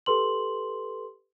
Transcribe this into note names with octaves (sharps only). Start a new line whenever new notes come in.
G4 A4 B4 C6 F#7